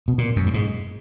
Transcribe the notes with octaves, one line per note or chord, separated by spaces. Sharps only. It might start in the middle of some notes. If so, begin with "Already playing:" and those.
B2
A#2
F#2
G2
G#2